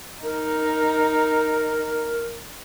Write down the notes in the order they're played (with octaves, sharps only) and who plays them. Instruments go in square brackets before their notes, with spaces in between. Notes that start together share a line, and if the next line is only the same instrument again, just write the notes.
[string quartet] D#4 [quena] A#4